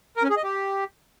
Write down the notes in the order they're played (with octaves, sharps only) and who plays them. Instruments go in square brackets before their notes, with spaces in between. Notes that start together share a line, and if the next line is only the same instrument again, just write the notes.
[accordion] A#4
C#4
G#4
D#5
G4